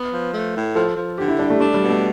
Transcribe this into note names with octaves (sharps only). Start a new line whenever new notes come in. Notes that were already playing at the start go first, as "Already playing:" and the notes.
Already playing: B3 B4
F3
A3
A2
F3 A4
F3
D3 G4
E4
G3 D4
A3
A3 D4
G3
B2
A3